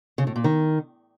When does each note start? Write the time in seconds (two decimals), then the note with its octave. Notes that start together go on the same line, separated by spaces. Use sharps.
0.18 C#3
0.27 A2
0.36 A#2
0.44 D#3